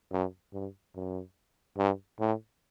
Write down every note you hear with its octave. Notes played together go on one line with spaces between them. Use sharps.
F#2
G2
F#2
G2
A2